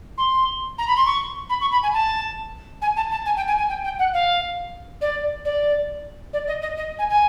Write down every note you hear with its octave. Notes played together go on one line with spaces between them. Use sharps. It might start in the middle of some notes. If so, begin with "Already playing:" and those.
C6
A#5
B5
C6
C#6
B5
C#6
B5
G#5
A5
G#5
A5
A5
G#5
G5
G#5
G#5
G5
G5
F#5
F5
D5
D5
D5
D#5
D#5
D#5
G#5
G#5